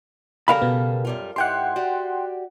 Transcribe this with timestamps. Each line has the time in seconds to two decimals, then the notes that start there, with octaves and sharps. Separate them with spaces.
0.48 C#3 G3 A4 A#4 F5 B5
0.62 B2 B3
1.05 F#2 G3 F4
1.36 G#2 E4 G4 F#5 G5 C6
1.76 F#4 G4 D5